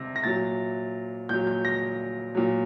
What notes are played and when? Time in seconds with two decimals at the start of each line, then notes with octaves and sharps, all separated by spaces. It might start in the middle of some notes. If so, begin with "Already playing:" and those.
Already playing: C3 A#6
0.16 A#6
0.24 A#2 F#3 A6
1.29 A#2 F#3 G6
1.47 G6
1.65 A#6
2.35 A#2 F#3